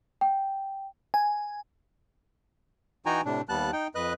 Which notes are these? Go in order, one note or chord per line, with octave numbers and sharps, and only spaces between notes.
G5
G#5
E3 D#4 F#4 G5 G#5 A#5
A2 C3 D4
D#2 G3 B3 A5 F#6
D#4 G5
F2 B4 D#5 F#6